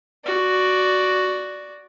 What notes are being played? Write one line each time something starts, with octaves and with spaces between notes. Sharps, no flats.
F#4 D5